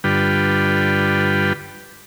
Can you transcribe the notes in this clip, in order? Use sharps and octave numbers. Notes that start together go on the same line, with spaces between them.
G2 D3 G3 F4 B4 G5